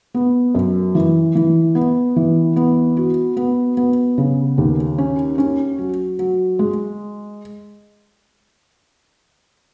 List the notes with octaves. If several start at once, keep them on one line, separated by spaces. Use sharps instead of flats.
B3
F#2
E3
E3
B3
E3
B3
F#4
B3
B3
C#3
D#2
C#4
C#4
F#3
F#3
G#3